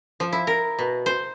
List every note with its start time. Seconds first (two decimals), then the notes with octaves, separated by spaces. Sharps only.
0.20 F3
0.32 E4
0.47 A#4
0.79 B2
1.06 C5